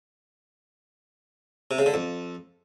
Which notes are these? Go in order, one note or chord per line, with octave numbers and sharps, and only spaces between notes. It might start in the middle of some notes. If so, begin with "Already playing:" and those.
C3
C#3
D3
F2